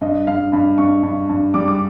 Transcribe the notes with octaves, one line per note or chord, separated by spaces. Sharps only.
G2 D#5
G2 F5
G2 B5
G2 C#6
G2
G2
G3 D6
D6